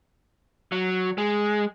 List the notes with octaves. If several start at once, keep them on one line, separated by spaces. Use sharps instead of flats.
F#3
G#3